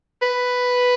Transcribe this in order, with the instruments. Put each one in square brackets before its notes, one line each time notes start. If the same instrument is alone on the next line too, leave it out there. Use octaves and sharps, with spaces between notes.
[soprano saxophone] B4